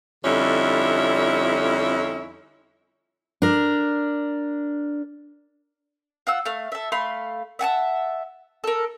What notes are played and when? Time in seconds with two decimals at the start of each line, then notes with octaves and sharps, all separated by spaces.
0.25 F2 D3 G3 C#4 D#4 E4
3.42 D4 A#4
6.27 F4 F#5 E6
6.45 A3 F5
6.72 A4 E5
6.92 A3 F5 B5 C6
7.59 E5 F#5 G#5 A5
8.64 A4 A#4